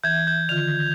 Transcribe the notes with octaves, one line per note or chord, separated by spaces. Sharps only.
E3 E5 G6 G#6
G6
D3 D#3 F4 F7